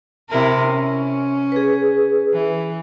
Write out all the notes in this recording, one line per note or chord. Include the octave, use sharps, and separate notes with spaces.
C3 E4 A#4
C#4
G#4 B4
E3